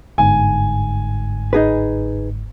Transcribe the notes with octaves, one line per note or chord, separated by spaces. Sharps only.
G1 G#2 G#5
D#4 G#4 B4